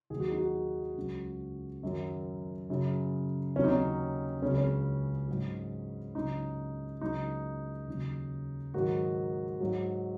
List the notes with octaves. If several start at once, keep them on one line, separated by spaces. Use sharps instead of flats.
D#2 D#3 F#3 G#4
F#4
D#4
F#4
C#2 C#3 F#3
F#2 D#3 F#3
F#2 C#3 F#3
D#2 C#3 F#3 C#4
D#4
C#4
C#2 C#3 F#3 C#4
C#4
G#2 F#3
C#2 C#3 F#3 D#4
C#2 C#3 F#3 D#4
D#2 C#3 F#3
G#2 D#3 F#3 F#4
G#2 F#3